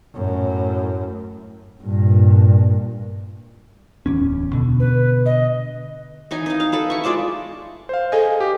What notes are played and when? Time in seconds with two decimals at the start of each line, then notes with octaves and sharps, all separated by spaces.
0.14 F#2 A2
1.83 G2 A#2
4.06 D1 E2 C#4
4.53 B2 D3
4.80 B4
5.26 D#5
6.31 E3 D#4 G#5
6.46 D#4 F5
6.60 F5
6.72 A4 B4 F5
6.90 E4 C#6
7.04 G#3 F4 D5 A5
7.89 C5 F5
8.12 G#4 A4 D#5 G#5
8.40 G4